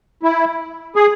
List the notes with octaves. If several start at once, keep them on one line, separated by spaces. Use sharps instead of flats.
E4
G#4